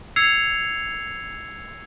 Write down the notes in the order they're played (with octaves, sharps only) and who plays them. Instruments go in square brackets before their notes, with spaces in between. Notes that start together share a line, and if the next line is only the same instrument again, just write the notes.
[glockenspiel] E6 G#6 C7 C#7 F7